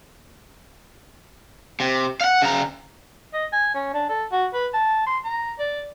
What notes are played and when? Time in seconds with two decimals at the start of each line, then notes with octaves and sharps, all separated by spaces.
1.80 C3
2.21 F5 F#5
2.42 C#3 A#5
3.33 D#5
3.52 G#5
3.75 C#4
3.94 D4
4.09 A4
4.32 F#4
4.54 B4
4.74 A5
5.06 C6
5.25 A#5
5.59 D5